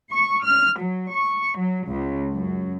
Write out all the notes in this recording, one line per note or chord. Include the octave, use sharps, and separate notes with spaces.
C#6
F6
F#3
C#6
F#3
C#2
F#2